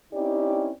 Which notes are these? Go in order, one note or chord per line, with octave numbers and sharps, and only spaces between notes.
C4 C#4 D#4 E4 G4 D5